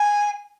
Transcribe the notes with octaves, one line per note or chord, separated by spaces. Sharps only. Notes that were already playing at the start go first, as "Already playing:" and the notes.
Already playing: G#5